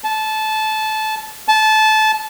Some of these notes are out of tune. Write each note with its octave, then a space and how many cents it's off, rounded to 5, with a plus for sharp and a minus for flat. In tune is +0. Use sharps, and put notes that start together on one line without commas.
A5 -20
A5 -20